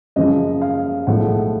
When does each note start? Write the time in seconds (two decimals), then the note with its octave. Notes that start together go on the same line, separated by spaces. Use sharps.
0.16 F#2 C#3 F3 D#5
0.62 F5
1.07 B1 A2 F3 G#3 F#5